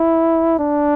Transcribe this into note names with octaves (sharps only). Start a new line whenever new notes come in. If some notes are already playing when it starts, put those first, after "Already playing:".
Already playing: E4
D4